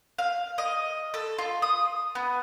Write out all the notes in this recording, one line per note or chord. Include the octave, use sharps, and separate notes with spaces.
F5
D#5
A4
F4
D#6
B3